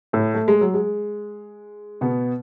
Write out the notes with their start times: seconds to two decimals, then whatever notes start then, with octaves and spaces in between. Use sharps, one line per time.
0.13 A2 A3
0.34 A3
0.48 G#3
0.61 F#3
0.74 G#3
2.01 B2 B3